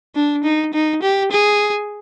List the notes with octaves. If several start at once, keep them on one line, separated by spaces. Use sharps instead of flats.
D4
D#4
D#4
G4
G#4